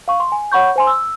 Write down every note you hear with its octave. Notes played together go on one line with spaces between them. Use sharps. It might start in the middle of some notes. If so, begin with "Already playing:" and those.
F5 C#6
C6
G#5
C#5 F#5 B5 C#6 G6
C5 G#5 C6
E6